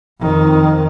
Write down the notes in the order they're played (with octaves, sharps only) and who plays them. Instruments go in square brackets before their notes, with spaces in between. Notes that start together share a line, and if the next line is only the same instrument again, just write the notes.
[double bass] F2 D#3